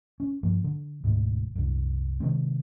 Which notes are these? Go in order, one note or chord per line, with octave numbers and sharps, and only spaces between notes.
C#4
G2 F3 A#3
D3
E1 D2 G#2
C2 F#2
C3 D#3 G#3 C4